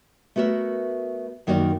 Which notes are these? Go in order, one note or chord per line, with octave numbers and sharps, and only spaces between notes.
A3 B3 F#4 A#4 E5
F#2 D#3 A#3 F#4 A#4 D5